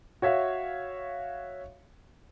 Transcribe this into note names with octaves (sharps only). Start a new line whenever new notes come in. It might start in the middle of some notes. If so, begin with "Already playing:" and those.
F#4 C#5 E5 F5